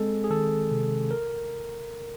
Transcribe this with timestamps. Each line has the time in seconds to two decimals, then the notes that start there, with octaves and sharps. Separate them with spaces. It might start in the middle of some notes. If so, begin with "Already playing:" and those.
Already playing: G#3 C4 G#4 A4
0.24 G#4
0.30 D#3 A4
0.71 C3
1.11 A#4